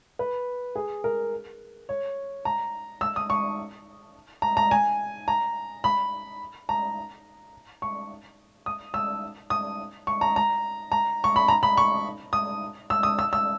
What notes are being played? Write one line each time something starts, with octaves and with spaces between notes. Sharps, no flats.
B4
G#4
A#4
C#5
A#5
E6
D#6
C#6
A#5
A#5
G#5
A#5
B5
A#5
C#6
D#6
E6
D#6
C#6
A#5
A#5
A#5
C#6
B5
A#5
B5
C#6
D#6
E6
D#6
E6
E6